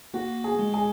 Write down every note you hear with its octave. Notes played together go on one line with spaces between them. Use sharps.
A#3 F#4 F#5
G#4 G#5
G#3
G#4 G#5